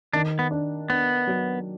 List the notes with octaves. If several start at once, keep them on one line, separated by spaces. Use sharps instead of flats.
D#3 D4
B3
D4
B3 D4
F#3